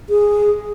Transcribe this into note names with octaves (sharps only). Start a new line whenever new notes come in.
G#4